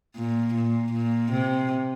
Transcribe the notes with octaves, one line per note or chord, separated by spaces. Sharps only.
A#2
A#2
A#2
C3